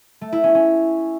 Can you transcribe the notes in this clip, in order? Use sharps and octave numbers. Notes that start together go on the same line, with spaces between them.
A3
E4
C#4
C#4